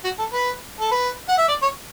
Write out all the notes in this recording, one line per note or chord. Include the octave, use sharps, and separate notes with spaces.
F#4
A4
B4
A4
B4
F#5
E5
D5
C#5